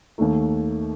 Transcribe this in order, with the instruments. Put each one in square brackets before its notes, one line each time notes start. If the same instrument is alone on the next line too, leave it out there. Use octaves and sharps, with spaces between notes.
[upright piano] D#2 D#3 A3